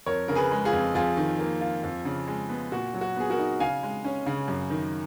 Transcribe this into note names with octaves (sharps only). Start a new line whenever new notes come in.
F2 A#4 C#5
C#3 A#4
G#4 B4
G#3
F4 G#4
F2
F2 F4 G#4
D#3
A#3
F4
F2
C#3
G#3
B3
A#2 F#4
F#3
F#4
B3 G#4
F#4 A#4
D#4
C#3 F5 G#5
G#3
C#4
C#3
F#2
D#3